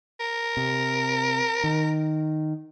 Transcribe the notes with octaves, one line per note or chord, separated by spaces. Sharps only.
A#4
C3
D#3